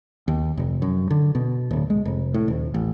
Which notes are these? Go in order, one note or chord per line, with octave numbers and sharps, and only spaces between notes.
D#2
F1
F#2
D3
B2
D1
G#3
F1
A2
D#1
A1